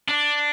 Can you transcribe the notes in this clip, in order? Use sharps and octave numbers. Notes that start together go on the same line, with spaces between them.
D4